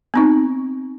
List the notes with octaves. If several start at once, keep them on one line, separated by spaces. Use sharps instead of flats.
B3 C4 D#4